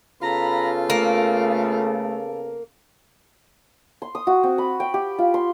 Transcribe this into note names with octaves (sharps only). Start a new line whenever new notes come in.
C#3 B3 F4 A4 A#5 B5
A3 A#3
C6
D#6
F#4
C4
B5
G5
G4
F4
C6